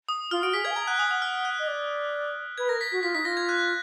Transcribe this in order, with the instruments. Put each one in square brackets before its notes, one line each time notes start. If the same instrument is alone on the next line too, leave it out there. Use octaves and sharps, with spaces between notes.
[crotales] D#6
[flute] F4 [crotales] F6
[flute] F#4 [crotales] D7
[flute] G#4 [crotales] B6
[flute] F5 [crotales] G#6
[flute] G#5
[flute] A#5 [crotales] G#6
[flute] F#5 [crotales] F#6
[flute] G#5 [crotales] D#6
[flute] F#5 [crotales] D#6
[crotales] F6
F#6
[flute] D#5
D5
[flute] B4 [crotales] G#6
[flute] A#4 [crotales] A#6
[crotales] B6
[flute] F#4 [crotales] B6
[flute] F4 [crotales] B6
[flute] D#4 [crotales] B6
[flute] F4 [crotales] A#6
[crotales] G#6
F#6